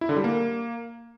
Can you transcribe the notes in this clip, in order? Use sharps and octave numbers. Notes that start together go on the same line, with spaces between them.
E4
D3
G3
A#3